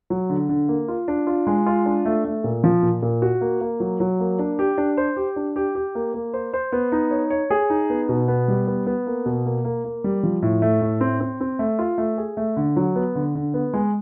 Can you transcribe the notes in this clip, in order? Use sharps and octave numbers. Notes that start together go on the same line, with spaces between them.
F#3
D3
D3
A#3
F4
D4
F4
G#3
F4
D4
A3
A3
A#2
F3
A#2
A#2
F#4
A#3
A#3
F#3
F#3
A#3
D4
G4
D4
C5
G4
D4
G4
G4
A#3
A#3
C5
C5
B3
D#4
C#5
C#5
G#4
D#4
B3
B2
B3
G3
B3
B3
A#3
B2
A#3
A#3
A#3
G3
F3
A2
A3
A2
C4
C4
C4
A3
F4
A3
G#4
A3
D3
F#3
B3
D3
D3
B3
G#3